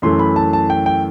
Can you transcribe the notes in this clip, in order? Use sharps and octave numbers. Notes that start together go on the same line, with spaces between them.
F#2 E3 A3 C6
B5
A5
A5
G5
G5